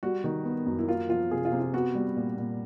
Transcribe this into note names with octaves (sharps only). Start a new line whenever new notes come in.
G3 F#4
D#3
B3
F#2
E4
A#3 F4
F3 F4
C3 G#4
F4
C3
F4
B3 F#4
G3
A#2
A#2